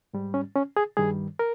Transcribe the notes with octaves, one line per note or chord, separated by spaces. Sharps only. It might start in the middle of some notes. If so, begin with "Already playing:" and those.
G#2 G3
C#4
C#4
G#4
G2 D#3 G3 G#4
A#4